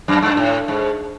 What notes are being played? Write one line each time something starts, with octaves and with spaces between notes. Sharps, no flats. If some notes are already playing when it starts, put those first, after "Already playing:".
F#2
G2
A2
G#2